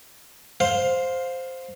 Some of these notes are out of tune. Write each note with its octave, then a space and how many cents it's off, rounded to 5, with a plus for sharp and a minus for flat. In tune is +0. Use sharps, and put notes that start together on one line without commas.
C5 +0 F5 +15